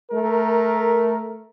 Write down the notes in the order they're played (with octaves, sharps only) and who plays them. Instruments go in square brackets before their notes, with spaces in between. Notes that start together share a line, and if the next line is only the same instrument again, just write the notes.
[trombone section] A3 A#4